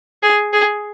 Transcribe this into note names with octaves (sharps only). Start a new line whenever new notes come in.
G#4
G#4